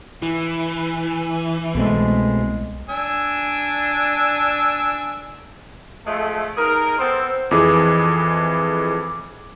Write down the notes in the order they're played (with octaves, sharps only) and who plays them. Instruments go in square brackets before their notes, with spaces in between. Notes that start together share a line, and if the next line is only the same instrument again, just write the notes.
[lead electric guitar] E3 [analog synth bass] E4
[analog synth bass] C2 [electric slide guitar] B2 A3 C4 [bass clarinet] G#3
[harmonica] D4 G#5 E6
[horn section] F3 G#3 A3
D#4 G#4 A#4
B3 C4 A4 C5
[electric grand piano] F2 E3 G#4 [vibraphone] D6